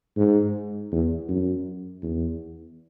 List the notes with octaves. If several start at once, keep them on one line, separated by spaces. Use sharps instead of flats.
G#2
E2
F#2
E2